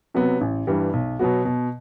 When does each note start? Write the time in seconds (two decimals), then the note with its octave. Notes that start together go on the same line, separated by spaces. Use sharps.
0.14 C3 F#3 B3
0.41 A1
0.67 G2 E3 G3
0.93 B1
1.19 B2 F#3 B3 F#4
1.45 B2